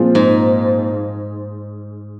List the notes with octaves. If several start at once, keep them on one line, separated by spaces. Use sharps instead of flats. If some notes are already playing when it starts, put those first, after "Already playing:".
Already playing: A#2 F3 G#3 C4 F4
G#2